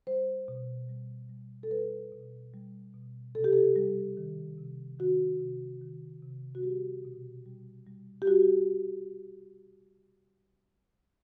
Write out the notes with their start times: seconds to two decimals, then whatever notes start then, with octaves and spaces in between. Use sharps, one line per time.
0.07 G3 C5
0.48 B2
0.89 G3
1.30 G3
1.63 A4
1.71 G3 B4
2.12 B2
2.54 G3
2.94 B2
3.35 C3 A4
3.44 G4
3.53 A4
3.76 G3
4.17 D#3
4.58 C3
4.99 D#3 F#4
5.40 C3
5.81 D#3
6.22 C3
6.55 F#4
6.63 G3 G4
7.05 B2
7.46 G3
7.87 G3
8.22 G4
8.27 G3 F#4